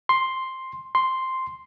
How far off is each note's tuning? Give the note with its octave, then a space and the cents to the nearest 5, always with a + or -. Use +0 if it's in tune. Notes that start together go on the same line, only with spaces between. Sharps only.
C6 +5
C6 +0